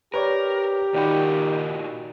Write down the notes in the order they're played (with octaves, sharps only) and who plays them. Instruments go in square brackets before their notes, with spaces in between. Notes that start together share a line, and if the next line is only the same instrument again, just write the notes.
[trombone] G4 [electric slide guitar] A#4 [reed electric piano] B4 C#5 D5
[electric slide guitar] A#2 F4 F#4 [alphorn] D#3 [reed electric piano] D5 G5 B5